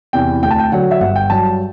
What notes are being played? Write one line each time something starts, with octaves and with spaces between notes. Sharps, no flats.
E2 C3 E3 G5
D2 G5
A5
G5
D3 F#3 F#5
E5
G1 F#5
G5
G2 F#3 A5